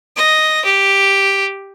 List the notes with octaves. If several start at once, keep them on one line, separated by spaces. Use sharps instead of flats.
D#5
G4